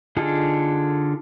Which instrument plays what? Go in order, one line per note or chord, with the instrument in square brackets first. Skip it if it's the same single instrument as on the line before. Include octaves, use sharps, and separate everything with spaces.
[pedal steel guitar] D3 D#4 F4 G#4 A4